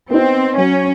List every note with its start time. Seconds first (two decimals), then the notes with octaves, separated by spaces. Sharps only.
0.10 B3 C4 D#4
0.56 F#3 C#4